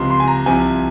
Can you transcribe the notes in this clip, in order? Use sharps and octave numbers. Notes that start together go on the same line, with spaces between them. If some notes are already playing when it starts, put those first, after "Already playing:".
Already playing: C#2 C3 F3 C6
C6
G#5
A#5
C2 C3 F3 G#5